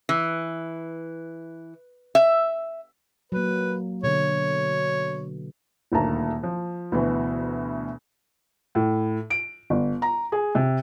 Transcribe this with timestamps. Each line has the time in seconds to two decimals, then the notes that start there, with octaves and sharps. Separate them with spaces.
0.09 E3
2.15 E5
3.32 F#3 A#3 B4
4.03 B2 D3 C#5
5.92 D#1 D2 D#3 A#3 A5 A#5
6.43 F3
6.92 D2 B2 E3 B3
8.75 A2
9.30 D7
9.70 G1
10.02 A#5
10.32 G#4
10.55 C3